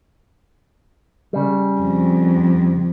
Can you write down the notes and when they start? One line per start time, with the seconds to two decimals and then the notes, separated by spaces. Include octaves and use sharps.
1.33 C#3 G3
1.81 F2